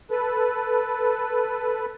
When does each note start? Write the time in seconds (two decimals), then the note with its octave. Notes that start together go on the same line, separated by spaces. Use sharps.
0.11 A4 B4